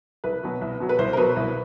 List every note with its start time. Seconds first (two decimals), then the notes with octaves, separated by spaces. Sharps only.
0.24 C2 B4
0.43 B2 F#3
0.61 C2
0.80 B2 F#3
0.89 B4
0.98 C2 C5
1.13 A#4
1.17 B2 F#3 B4
1.36 C2